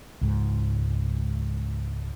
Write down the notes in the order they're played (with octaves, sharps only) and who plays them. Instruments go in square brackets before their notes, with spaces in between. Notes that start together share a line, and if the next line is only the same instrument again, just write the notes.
[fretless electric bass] C#2 G#2